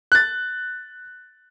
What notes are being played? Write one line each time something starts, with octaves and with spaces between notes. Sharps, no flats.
F#6 A6